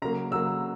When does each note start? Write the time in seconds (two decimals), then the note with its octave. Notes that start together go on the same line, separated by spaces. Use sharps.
0.02 C#3 F#3 A#3 A#5
0.31 C#3 F#3 A#3 E6